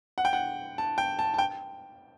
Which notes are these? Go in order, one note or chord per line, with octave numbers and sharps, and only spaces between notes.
F#5
G5
F#5
A5
G5
A5
A5
G5